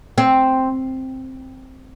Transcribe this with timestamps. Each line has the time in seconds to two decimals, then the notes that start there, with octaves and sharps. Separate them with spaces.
0.18 C4